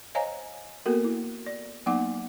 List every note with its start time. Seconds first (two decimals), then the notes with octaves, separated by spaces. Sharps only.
0.15 C5 C#5 D#5 F5 G#5 A#5
0.86 A#3 B3 F#4 A4 A#4
1.04 E4
1.46 D5
1.86 F#3 A#3 B3 D#4 F#5 D6